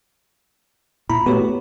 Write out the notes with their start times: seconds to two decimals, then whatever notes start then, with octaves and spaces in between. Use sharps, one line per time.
1.10 A#2 E4 A#5 B5
1.26 A3 B3 F#4 G4 C#5